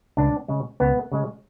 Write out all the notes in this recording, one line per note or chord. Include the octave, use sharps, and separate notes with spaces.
C#2 D4
C#3 G#3
C#2 B3
C#3 G#3